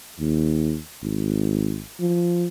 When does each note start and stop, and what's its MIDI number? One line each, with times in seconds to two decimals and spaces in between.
0.20 0.78 39
1.02 1.81 32
2.00 2.47 53